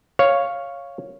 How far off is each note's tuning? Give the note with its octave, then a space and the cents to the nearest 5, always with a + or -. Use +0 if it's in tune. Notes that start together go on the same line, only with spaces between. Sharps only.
C#5 +0 F5 +0